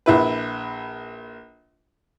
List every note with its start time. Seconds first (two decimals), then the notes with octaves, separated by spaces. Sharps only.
0.06 A#1 E4 B4